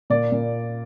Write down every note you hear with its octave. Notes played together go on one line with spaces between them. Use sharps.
A#2 D5
A#2